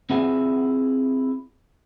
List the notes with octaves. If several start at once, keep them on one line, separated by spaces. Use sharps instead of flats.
C4 E4 F4 G#4 E5 G#5